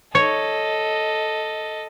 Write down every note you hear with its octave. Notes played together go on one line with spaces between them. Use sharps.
A4 C#5 D#5